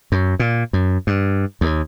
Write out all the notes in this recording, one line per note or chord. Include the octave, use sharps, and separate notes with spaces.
F#2
A#2
F#2
G2
D#2